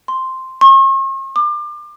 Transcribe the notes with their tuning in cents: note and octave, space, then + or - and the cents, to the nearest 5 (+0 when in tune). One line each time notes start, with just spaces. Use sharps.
C6 +0
C#6 -45
D6 +35